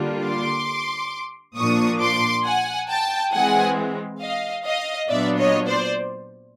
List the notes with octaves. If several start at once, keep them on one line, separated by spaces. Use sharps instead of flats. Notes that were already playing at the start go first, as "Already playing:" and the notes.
Already playing: D3 G3 A#3 D4 F4
C6 D6
A#2 F3 A#3 D4 C#6 D#6
C6 D6
F#5 G#5
G5 A5
E3 G#3 C4 F#5 G#5
D#5 F5
D#5 F5
A#2 F#3 B3 D4 F4 D5 E5
C#5 D#5
C5 D5